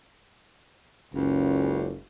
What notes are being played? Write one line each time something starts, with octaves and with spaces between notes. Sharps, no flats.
F#1 C#2